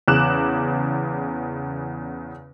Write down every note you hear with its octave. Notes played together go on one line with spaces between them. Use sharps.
E2 C#3 D6 F#6 E7